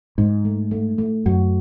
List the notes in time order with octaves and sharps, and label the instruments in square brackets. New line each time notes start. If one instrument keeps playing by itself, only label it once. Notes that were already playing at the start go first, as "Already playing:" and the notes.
[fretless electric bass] G#2 [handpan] D#4
[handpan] A3
A3
A3
[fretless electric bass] F#2 [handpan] F#4